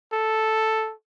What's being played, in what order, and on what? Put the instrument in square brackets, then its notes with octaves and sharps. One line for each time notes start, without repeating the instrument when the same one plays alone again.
[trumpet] A4